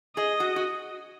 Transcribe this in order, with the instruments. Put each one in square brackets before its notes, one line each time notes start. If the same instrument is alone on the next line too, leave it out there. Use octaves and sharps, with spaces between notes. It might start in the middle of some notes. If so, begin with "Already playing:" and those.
[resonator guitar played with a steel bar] G#4 [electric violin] D#5
[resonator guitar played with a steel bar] F#4
F#4